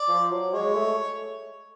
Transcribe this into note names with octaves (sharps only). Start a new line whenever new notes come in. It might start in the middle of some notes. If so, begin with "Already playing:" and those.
Already playing: D5
F3
F#3
G#3 C#5
A3